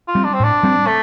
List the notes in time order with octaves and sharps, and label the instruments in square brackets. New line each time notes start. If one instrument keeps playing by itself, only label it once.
[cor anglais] F4
[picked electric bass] G3 C4
[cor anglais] D4
C4
[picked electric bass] A2 [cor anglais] D4
[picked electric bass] G3 C4
[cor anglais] A3